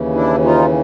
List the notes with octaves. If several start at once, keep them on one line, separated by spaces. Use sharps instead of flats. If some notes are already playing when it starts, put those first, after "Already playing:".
Already playing: D#2 C#3 E3
D4 E4
D#4 F4